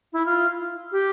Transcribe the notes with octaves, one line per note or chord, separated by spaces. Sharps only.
E4
F4
G4